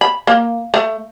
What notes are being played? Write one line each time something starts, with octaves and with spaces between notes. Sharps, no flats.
B5
A#3
A3